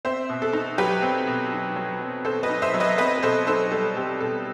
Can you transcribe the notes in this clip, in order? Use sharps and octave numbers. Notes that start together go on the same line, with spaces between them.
C4 C5 E5
B2
A4
D#4
F#3 G4 B4
C4
B2
D#4
F#3
C4
B2 A4 C5
B4 D#5
D#4
C5 E5
F#3
B4 D#5
C4 B4 D#5
B4
B2 A4 C5
D#4 A4 C5
G3 A4
C4 G4
B2 A4